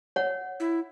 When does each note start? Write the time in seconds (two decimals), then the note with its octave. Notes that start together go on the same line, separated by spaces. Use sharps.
0.16 C#5 F#5
0.60 E4